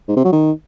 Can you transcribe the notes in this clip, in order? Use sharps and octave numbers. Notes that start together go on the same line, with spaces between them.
G#2
C3
F#3
D#3